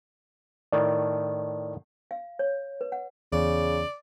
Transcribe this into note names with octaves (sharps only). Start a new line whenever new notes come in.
A2 D#3 D5
F5
C#5
B4
F#5
E2 C#3 D5